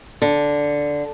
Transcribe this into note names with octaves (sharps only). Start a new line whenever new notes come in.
D3